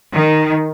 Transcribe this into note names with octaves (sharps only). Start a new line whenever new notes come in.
D#3